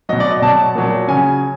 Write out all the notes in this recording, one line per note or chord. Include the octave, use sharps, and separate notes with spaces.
B2 F#3 D#5
D5
D#5
B2 F#3 A5
A#2 F#3
C#3 F#3 G#5